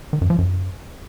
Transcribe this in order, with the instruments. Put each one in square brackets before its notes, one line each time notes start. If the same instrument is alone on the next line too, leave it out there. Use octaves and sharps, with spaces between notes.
[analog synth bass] D#3
F#2
F3
F#2